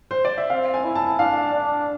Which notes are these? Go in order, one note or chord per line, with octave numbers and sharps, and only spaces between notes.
C5
D5
E5
C4 F5
G#5
E4
A5
D4 F5
D4